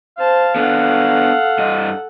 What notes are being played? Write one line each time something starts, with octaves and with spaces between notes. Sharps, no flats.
C5 F5 A5
B3 D4 A4 F#5
G2 D#5